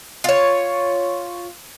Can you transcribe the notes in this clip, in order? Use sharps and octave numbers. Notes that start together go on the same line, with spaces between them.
F4 C#5